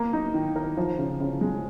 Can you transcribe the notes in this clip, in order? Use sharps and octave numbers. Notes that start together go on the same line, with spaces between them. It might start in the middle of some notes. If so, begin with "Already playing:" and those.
Already playing: A#3
D#4
D#3
A#4
F3
C#3
C#3
G#3